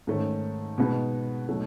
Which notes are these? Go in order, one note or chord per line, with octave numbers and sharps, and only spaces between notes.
G#2 D#3 A3 C#4
B2 G#3 B3 D#4
B2 F#3 A3 D#4